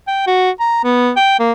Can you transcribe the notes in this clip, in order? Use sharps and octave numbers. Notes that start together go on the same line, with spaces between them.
G5
F#4
A#5
B3
G5
A#3